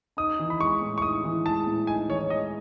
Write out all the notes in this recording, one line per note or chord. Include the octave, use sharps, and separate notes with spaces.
D#4 D#6
E3
B5
G#3 C#6
A2
C#6
D#4 D#6
E3
G#3 A5
A2
D#4 G#5
E3 C#5
G#3 D#5